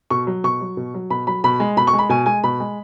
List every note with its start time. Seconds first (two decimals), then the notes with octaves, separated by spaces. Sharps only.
0.10 B2 C#6
0.27 F#3
0.44 B2 C#6
0.61 F#3
0.77 B2
0.94 F#3
1.10 B2 B5
1.27 F#3 B5
1.44 B2 B5
1.60 G#3
1.77 B2 B5
1.87 C#6
1.93 G#3
1.99 B5
2.09 B2 G#5
2.26 G#3 G#5
2.44 B2 B5
2.60 G#3